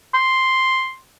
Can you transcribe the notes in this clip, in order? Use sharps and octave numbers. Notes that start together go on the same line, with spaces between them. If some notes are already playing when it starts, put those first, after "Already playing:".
C6